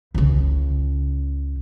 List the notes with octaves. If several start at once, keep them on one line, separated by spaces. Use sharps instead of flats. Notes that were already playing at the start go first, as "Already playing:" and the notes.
C#2 C#3